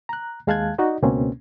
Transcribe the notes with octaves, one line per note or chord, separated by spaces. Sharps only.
A#5 F#6
D#2 G#3 F5 A5 F#6 G#6
D#4 F#4 D5 D#5
C#2 B2 A#3 C4 C#4